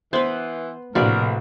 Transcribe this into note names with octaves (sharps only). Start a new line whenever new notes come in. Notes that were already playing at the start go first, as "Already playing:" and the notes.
E3 B3 B4 C5
A#1 A2 C3 F#4 A#4 B4 D5